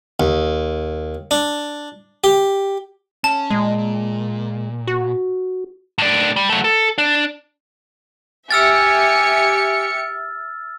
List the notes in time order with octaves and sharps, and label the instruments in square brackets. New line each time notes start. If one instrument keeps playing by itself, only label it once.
[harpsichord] D#2
D4
G4
[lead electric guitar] C#4 [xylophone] A5
[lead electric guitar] A#2 [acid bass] G#3
[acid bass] F#4
[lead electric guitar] A2 D5
G3
F#3 A3
A4
D4
[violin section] G4 E5 C#7 [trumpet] G#5 [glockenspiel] E6 F6 A6